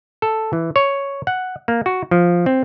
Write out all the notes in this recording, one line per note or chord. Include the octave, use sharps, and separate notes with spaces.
A4
E3
C#5
F#5
A#3
F#4
F3
C4